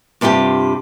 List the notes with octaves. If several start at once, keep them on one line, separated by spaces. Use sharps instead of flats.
G2 C3 G3 F4 G4